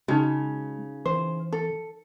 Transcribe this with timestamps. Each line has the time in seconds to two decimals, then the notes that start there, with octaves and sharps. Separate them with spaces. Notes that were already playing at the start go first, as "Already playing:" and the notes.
0.08 C#3 G#3 D#4 F#4
1.06 E3 C5
1.53 A4